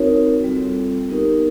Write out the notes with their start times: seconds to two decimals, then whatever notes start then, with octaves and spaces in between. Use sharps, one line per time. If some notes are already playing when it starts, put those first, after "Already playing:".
Already playing: C4 D#4 F#4 A#4 C#5
0.44 G3 C4 F4 A4
1.10 B3 D#4 G4 A#4